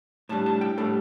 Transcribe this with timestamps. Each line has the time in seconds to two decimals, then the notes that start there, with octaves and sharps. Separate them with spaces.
0.29 A2 G3 D4 A5
0.46 A5
0.61 G5
0.78 A2 G3 D4 A4